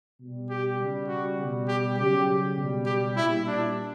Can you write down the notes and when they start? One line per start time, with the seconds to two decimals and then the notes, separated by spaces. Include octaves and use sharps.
0.20 B2 G3
0.49 G4
0.79 C#3 G3
1.08 F#4
1.39 B2 G3
1.68 G4
1.97 C#3 F#3 G4
2.57 B2 G3
2.86 G4
3.16 A#2 G3 E4
3.46 D4